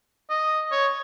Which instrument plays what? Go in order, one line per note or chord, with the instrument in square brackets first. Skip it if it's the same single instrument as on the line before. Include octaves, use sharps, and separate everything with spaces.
[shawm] D#5
C#5